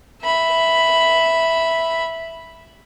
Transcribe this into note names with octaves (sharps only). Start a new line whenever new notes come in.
E5 B5